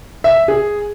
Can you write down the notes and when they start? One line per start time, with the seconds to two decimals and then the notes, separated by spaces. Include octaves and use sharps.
0.24 E5
0.48 G#4